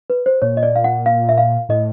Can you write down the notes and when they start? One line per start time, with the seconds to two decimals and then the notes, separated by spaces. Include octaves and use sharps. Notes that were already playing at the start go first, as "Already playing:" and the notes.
0.10 B4
0.26 C5
0.42 A#2 C#5
0.57 D#5
0.63 D5
0.76 F5
0.84 F#5
1.06 F5
1.29 E5
1.38 F5
1.69 A2 D#5